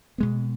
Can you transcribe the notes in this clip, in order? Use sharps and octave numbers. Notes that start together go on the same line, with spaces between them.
B2 G#3 B3